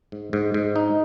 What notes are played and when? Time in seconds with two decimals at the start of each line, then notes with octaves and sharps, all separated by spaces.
0.12 G#2
0.33 G#2
0.54 G#2
0.76 D#4